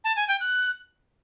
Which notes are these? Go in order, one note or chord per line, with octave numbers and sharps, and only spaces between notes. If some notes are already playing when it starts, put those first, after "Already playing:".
A5
G#5
G5
F#6